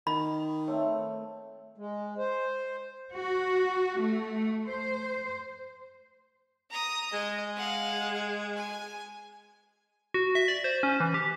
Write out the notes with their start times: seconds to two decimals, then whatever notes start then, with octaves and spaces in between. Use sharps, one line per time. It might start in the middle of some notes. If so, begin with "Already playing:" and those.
0.07 D#3 B5
0.68 A3 C4 C#5
1.78 G#3
2.18 C5
3.14 F#4
4.01 A3
4.66 C5
6.71 A#5 D#6
7.13 G#3 D#5
7.56 F5 F#5
8.56 G#5
10.14 F#4
10.35 E5
10.48 D5
10.64 C5
10.83 C#4
11.00 E3
11.14 G4